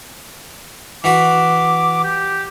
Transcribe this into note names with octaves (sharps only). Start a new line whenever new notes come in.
E3 F#4 B4 D6
G4